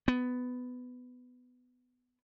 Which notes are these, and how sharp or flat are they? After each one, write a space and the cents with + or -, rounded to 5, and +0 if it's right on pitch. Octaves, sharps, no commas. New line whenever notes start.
B3 +15